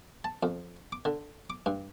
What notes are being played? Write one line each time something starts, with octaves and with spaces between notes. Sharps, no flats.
A5
F2
D6
D3
D6
G2